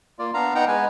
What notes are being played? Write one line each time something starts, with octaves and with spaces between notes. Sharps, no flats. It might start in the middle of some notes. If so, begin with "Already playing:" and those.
A#3 F4 D5
B3 D4 F5 A#5
B3 D#4 F#5 G5 A#5
G#3 B3 B4 G#5